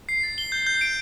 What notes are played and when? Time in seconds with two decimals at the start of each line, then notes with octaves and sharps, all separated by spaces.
0.09 C7
0.23 A6
0.38 G7
0.52 G6
0.67 G6
0.81 D7